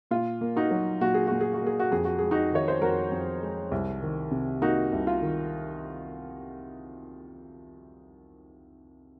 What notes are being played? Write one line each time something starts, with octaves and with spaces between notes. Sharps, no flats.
A#2 F4
A#3
D#4 F#4
F#3
A#2 F#4
G#4
A#2 F#4
G#4
F#4
A#3 G#4
F#4
F2 G#4
F#4
G#3 G#4
D#4 F#4
D#3 C#5
C5
F2 F#4 A#4
F2
G#3
C2
D#3
C3
A#3 D#4 F#4
C2
F4
D#3